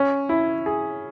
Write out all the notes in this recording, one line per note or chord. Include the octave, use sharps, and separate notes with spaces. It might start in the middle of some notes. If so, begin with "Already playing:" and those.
Already playing: C#4
E4
G#4